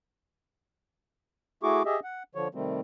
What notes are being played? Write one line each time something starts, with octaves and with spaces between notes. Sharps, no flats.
A3 E4 F#4 G#4 C#6 D6
G4 G#4 D#5 E5
F#5
D3 F3 C#5
C3 D#3 G3 A3 C4